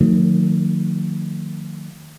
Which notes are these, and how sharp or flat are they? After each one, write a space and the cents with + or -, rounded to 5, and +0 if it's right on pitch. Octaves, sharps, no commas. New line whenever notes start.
D#3 -15 F#3 -45 A3 +45